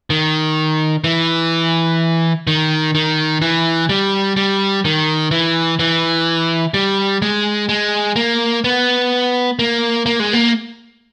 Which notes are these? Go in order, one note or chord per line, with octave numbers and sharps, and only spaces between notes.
D#3
E3
D#3
D#3
E3
G3
G3
D#3
E3
E3
G3
G#3
G#3
A#3
B3
A#3
A#3
G#3
A#3